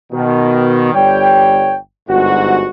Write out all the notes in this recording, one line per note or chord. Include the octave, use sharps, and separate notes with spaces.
B2 D#3
G1 G3 C#5 G5
G1 G#2 F#4